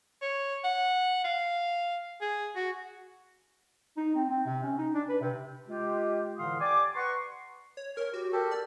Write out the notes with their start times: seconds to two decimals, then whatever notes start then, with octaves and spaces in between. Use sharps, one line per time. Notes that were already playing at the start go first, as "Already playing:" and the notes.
0.22 C#5
0.64 F#5
1.24 F5
2.21 G#4
2.56 F#4
3.97 D#4
4.15 C4
4.30 C4
4.46 C3
4.63 C#4
4.78 D#4
4.94 D4
5.09 B4
5.21 C3
5.67 G#3 F4 G4
6.38 A2 D3 E3 F5 C6 D#6
6.59 G4 D5 G5 G#5 D6
6.95 B4 F#5 A#5 C6 C#6
7.77 C#5
7.97 A#4 C#5
8.14 F#4 G4
8.33 G4 A4 A#4
8.51 D5